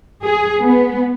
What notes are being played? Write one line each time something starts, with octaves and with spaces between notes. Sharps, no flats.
G#4
B3